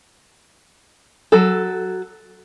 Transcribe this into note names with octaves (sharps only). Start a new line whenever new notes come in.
F#3 A4